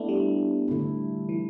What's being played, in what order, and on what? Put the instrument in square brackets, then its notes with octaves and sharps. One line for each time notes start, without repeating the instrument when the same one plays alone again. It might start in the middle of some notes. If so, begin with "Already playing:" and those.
Already playing: [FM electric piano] A3 B3 D4 E4
G3
[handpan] D3 A3 E4
[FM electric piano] E3